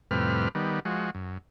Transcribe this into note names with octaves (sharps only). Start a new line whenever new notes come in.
F2 A2 C3 G3 B4 F6
D#3 G3 B3
F3 G#3 F#4
F#2